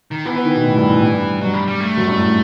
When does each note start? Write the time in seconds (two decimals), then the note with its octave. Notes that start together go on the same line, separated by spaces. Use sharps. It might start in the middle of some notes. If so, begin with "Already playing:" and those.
0.11 D#3
0.25 E3 B3
0.36 B3
0.45 D#3
0.55 B2
0.64 A2
0.77 G2
0.90 A2
1.02 G2
1.41 G2 F#3
1.54 G3
1.67 G3
1.80 A3
1.97 F#2
2.08 G2
2.18 A2